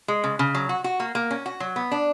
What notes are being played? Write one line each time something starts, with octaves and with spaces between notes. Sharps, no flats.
G#3
C#3
C#3
F#3
F#4
F#4
A#3
A#3
C#4
F#4
F#3
B3
D4